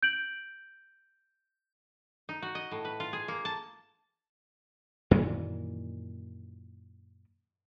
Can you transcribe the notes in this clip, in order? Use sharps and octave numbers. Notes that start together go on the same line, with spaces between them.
G6 D7 F#7
D#4
F#4
D#5
A2
B4
F4
G#4
A#3
A5
F#2 A#2 D#3 E3